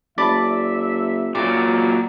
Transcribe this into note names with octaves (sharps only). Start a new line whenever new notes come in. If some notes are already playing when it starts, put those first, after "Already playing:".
F#1 D5 E5 A5 B5
A#2 F#3 D5